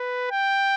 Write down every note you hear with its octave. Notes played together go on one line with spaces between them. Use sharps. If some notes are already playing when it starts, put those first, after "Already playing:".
Already playing: B4
G5